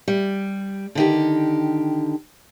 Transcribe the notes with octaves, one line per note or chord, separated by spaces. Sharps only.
G3
D3 D#3 G4